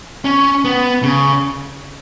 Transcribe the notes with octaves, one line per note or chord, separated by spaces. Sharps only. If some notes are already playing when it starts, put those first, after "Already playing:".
C#4
B3
C#3